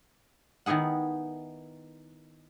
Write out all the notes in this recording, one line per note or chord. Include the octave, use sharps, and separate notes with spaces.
D#3 B3 E4 G#4 F#5